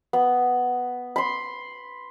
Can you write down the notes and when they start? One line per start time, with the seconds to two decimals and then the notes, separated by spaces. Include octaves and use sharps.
0.13 B3
1.16 B5 C6